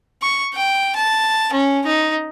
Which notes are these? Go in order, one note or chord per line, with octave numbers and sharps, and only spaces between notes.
C#6
G5
A5
C#4
D#4